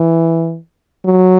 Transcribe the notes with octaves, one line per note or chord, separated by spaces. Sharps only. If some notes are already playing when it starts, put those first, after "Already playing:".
Already playing: E3
F#3